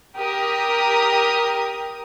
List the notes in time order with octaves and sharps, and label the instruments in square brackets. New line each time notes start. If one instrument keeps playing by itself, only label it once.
[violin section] G4 A#4 D#6